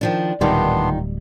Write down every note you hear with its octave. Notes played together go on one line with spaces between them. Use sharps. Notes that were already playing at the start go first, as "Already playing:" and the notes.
D#3 F3 D4
D1 A#2 D#3 G3 B3 D4 D#4 C6